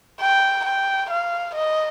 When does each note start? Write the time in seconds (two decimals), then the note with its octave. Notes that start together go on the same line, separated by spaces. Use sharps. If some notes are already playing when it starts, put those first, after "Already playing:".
0.21 G5
0.65 G5
1.10 F5
1.55 D#5